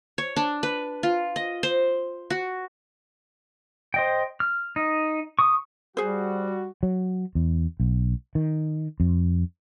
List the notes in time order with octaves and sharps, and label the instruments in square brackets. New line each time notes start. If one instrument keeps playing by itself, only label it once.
[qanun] C#5
D4
B4
F4
D#5
C5
F#4
[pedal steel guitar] C5 D#5 G5
F6
D#4
C#6 D#6
[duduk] G3 [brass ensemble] F#4 [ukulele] G#4 C5
[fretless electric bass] F#3
E2
B1
D#3
F2